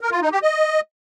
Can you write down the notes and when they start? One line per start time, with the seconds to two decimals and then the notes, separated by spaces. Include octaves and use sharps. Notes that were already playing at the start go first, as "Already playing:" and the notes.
0.01 A#4
0.11 F4
0.22 D#4
0.32 G4
0.42 D#5